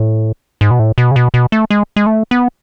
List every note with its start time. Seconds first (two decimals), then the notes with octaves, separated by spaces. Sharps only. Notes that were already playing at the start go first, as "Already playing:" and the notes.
Already playing: A2
0.61 G#2
0.71 B2
0.79 A2
0.98 B2
1.11 C#3
1.16 B2
1.34 B2
1.52 A3
1.70 G#3
1.96 G#3
2.06 A3
2.31 B3